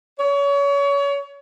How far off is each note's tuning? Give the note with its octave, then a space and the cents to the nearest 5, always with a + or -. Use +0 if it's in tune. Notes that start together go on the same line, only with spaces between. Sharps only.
C#5 +30